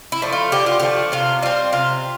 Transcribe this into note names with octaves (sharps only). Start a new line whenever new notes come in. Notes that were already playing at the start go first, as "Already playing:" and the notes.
E4
F3 A3 D4
F4
D3 G4
F4
F3 A3 D4 G4
C3 F4
G3 C4 F4
C3 F4